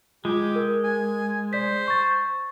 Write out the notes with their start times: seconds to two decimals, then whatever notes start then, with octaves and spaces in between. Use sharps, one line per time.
0.25 G#3 F4 G4
0.55 A#4
0.84 G#5
1.53 C5 D5 B6
1.88 C#6 A6